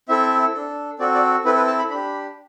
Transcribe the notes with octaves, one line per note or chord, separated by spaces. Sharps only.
C4 E4 A4 E5
D4 A4
C4 F#4 A4 D5
D5
C4 E4 A4 B4
B4
A5
B5
D4 G4 B5